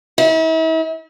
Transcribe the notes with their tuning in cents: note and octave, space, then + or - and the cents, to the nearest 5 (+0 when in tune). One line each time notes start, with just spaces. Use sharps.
E4 -40